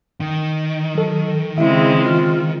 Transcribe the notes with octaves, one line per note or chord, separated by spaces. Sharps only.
D#3
F#3 A4
C#3 G#3 C4 E4 E5
F4